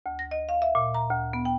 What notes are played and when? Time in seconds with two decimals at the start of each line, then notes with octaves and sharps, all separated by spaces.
0.06 D2
0.19 A#6
0.31 D#5
0.49 F5
0.62 E5
0.75 A#2
0.94 A#5
1.10 D2
1.33 B3
1.45 G5